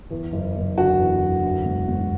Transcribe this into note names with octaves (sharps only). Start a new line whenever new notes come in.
E2
F#1
F#1
D3 F#4
E2
F#1
D2
E1
E1